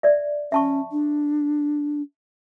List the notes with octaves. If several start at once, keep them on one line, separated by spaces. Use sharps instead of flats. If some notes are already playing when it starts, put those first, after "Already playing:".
D5 E5
C#4 E5 A5 C#6
D4